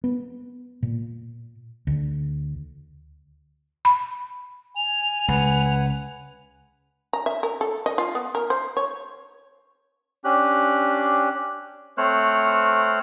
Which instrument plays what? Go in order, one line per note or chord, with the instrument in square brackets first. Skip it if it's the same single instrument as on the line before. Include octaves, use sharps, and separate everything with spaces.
[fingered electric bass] B3
A#2
D2
[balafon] B5
[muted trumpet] G#5 [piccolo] F7
[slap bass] C#2 [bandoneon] B4 F#5
[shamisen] A#5
E5
A#4
A4
D#5
F4
B3
A#4
C5
C#5
[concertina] C#4 D4 G4 F#6
A3 C4 C5 C#5 F6 F#6